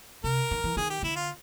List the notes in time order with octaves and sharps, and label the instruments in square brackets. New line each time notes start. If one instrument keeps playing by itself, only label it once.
[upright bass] C3 [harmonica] A#4
[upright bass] D#3
E3
[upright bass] D#3 [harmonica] G#4
[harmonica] G4
[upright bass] D3 [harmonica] E4
[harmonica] F4